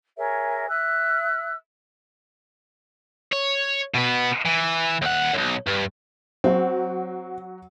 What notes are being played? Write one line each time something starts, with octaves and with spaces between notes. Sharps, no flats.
G#4 A#4 C#5 E5
E5 E6 F#6
C#5
B2 B3
E3
D#2 F#5
B1 F#2
G2
F#3 C4 F#4